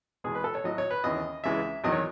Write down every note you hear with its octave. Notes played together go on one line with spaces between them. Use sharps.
E2 B2 G#3 G#4
B4
A4
C#5
A2 F#3 D#5
C#5
B4
D#2 C#3 E3 D#5
C#2 C#3 E3 G#3 E5
E2 D#3 F#3 D#5
C#5